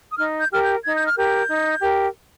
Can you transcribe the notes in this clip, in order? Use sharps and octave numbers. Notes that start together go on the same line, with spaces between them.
D#6
D#4 F6
G6
G4 A#4 F6
G6
D#4 G#6
G6
F6
G4 A#4 G6
D#4
G4 A#4